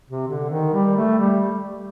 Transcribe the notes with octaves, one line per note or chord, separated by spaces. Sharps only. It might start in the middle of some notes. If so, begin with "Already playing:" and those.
C3
D3
D#3
G3
A3
G3